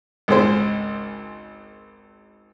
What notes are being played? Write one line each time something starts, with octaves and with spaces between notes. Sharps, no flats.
G#1 C#2 G#3 C5